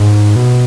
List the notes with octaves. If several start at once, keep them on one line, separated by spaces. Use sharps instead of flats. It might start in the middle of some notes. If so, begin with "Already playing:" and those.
Already playing: G#2
B2